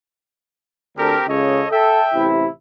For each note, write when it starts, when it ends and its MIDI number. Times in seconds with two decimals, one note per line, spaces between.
0.97 1.16 38
0.97 1.16 50
0.97 1.25 60
0.97 1.25 67
0.97 1.16 69
0.97 1.25 70
1.28 1.62 37
1.28 1.62 49
1.28 1.70 69
1.28 1.70 73
1.28 1.70 75
1.71 2.03 69
1.71 2.28 76
1.71 2.28 79
2.14 2.48 33
2.14 2.48 48
2.14 2.48 64